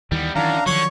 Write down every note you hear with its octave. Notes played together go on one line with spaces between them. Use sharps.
D#2 D#3 E3 G3 B3
F#2 D#3 E3 D4 F5 A#5
D3 D#3 F3 F#3 C#5 C#6